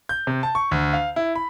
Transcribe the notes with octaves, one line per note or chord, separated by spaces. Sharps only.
G6
C3
A5
C#6
D2
F5
E4
B5